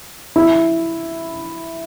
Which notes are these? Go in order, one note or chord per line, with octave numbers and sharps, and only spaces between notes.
E4